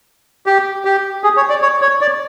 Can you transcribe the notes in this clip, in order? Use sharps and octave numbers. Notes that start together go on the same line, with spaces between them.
G4
G4
G#4
C#5
D5
C#5
C#5
D5